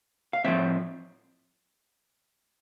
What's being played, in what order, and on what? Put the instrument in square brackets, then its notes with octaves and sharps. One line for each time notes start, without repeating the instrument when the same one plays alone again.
[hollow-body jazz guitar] F5
A2 F3 G#3 C4 E5